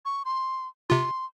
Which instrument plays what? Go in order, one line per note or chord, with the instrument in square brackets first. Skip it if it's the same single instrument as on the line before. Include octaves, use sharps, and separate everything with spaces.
[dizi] C#6
C6
[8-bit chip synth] C3 F4 [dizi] C6